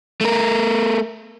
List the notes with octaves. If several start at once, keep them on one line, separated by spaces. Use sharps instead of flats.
A3 A#4